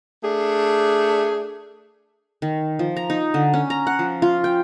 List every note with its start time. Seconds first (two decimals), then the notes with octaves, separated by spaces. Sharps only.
0.24 A3 D4 G#4
2.42 D#3
2.79 F3
2.96 A#5
3.10 D#4
3.34 D3
3.54 C#4
3.70 A#5
3.87 F#5
3.99 F3
4.22 F4
4.44 G5